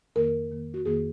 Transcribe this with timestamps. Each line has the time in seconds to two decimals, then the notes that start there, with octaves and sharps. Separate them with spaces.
0.16 F2 D#3 A#3 A#4
0.51 F2 D#3 A#3
0.74 F#4
0.85 F2 D#3 A#3 G#4